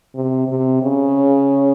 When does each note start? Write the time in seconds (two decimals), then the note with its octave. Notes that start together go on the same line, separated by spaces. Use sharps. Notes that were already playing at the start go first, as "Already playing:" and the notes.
0.15 C3
0.48 C3
0.82 C#3